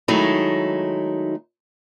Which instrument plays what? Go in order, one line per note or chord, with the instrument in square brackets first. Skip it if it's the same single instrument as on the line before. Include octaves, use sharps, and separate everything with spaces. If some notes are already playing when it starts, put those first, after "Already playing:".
[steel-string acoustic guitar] D#3 F#3 G#3 A3 D#4 E4